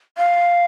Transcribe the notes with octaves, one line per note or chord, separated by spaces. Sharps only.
F5